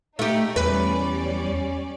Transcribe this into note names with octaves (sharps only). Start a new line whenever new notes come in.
A3 D#4 G4
E2 G3 C#4 B4 D5